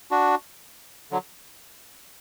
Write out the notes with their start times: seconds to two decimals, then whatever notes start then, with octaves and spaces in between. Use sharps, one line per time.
0.11 D4 F#4
1.11 D3 F#3